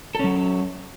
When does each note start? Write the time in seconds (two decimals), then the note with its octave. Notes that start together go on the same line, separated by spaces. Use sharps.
0.15 A4
0.19 C#4
0.24 F#3